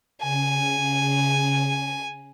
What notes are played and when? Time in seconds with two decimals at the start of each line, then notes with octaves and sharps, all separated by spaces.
0.22 C#3 G#5